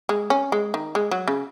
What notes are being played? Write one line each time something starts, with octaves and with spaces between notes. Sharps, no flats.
G#3
C#4
G#3
D#3
G#3
F#3
C#3